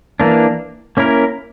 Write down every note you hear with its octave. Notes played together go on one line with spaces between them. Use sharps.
E3 A#3 D4
A#3 C#4 E4 A#4